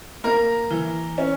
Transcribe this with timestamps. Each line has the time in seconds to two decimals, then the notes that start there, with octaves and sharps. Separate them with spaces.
0.24 A#3 A#4 A#5
0.70 E3
1.18 C#4